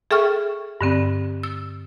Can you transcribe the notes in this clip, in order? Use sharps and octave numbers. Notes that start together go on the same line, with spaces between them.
G#4 A4 E5 G5 C#6 F6
G2 D3 C4
E6